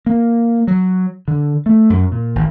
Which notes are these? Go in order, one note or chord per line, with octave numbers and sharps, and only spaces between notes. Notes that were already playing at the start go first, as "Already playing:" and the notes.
A#3
F#3
D3
A3
F#2
A#2
G#1